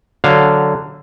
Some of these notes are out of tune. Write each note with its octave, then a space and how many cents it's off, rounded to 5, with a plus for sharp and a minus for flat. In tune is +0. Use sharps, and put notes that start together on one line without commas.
D3 +0 F#3 +0 F5 +0